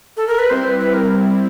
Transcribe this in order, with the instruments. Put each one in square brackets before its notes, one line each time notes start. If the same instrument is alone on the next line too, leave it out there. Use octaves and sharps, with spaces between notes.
[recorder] A4
A#4
B4
[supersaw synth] G3 C4 E4 [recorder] C5
[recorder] B4
B4
A#4